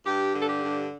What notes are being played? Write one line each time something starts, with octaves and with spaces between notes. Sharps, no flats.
G2 G4
D3
A4
G4
G2